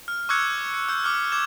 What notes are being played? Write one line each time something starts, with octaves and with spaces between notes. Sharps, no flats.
F6
C#6 D6 E6 F#6 G#6 C#7
C#7
E6 G6
D6 F6
D6 G#6 E7